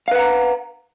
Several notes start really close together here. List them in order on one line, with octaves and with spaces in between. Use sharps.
F5 B4 F#5 A#5